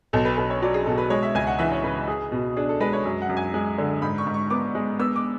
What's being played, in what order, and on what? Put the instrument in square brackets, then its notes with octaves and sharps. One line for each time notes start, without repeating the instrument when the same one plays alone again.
[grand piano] B1 [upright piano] A4
[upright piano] B4
[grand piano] B1 [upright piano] B4
[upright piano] C#5
[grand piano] F#3 [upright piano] D5
[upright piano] G#4
[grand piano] B2 [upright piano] A4
[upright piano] B4
[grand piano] G#3 [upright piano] C#5
[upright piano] E5
[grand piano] C#2 [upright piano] G#5
[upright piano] F#5
[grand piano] E3 [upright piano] E5
[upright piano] C#5
[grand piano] C#3 [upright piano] B4
[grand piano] G#4
B2
[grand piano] D4 [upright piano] G#4
[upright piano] A4
[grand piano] G#3 [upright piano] B4
[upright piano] C#5
[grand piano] F#2
[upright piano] F#5
[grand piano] F#2
[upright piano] G#5
[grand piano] G#3
D3
[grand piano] G#2 [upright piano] B5
[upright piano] C#6
[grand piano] G#2
[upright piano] C#6
[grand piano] B3 [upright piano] D6
[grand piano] G#3
[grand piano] B3 [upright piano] E6
[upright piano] D6